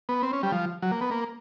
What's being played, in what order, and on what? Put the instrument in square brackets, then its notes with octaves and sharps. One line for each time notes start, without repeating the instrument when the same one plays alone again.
[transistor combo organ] B3
C4
C#4
G3
F3
F#3
A#3
B3
A#3